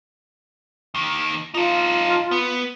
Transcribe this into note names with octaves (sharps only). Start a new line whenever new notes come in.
D#2 D#3
D#4 F4 A4
B3